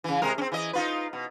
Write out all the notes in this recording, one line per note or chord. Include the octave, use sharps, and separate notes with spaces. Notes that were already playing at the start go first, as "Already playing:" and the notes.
C#3 E3
C3 G#3 A#4
C4 C#4
E3 D#5
D#4 F4 B4
B2